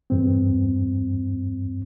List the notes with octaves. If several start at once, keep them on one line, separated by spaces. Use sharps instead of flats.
E2 G2 C4